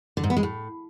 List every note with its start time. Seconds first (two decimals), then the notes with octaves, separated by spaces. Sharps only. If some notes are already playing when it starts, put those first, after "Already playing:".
0.17 D3
0.24 G#2
0.30 B3
0.37 G#3
0.43 A2